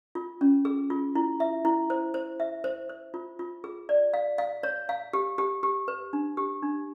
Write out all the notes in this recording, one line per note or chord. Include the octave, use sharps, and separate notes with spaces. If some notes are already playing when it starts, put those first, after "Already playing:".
F4
C#4
G#4
F4
E4
E5
E4
C5
C5
E5
C5
C5
F4
F4
G#4
D5
F5
F5
C#5
F5
G4
G4
G4
B4
D4
G4
D4